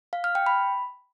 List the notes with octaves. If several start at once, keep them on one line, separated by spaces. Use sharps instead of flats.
F5
F6
G5
B5